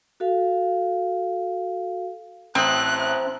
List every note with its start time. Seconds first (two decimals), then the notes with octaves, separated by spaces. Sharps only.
0.20 F#4 A4 F5
2.55 A1 C4 E5 A5 A#5 D#6 F#6